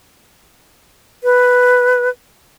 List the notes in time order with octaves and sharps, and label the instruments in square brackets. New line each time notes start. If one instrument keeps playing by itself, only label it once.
[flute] B4